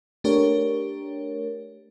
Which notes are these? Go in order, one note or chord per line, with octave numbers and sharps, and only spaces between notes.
A3 D4 G4 A#4 C#5